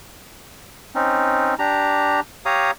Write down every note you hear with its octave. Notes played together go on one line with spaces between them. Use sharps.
C4 C#4 D#4
D4 G4 A#5
G4 C#5 F5 A#5 D#6